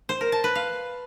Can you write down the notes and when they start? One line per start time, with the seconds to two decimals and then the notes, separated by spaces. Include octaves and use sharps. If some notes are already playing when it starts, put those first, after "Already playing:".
0.09 C5
0.21 A#4
0.32 A5
0.44 B4
0.55 F5